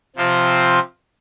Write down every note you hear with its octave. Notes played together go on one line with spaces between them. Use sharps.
C3 F3 C4 F4